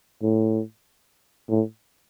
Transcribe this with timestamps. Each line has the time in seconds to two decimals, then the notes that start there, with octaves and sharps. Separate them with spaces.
0.23 A2
1.50 A2